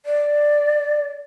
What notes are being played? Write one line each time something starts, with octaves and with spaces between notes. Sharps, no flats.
D5